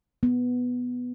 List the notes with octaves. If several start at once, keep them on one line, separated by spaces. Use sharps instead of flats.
B3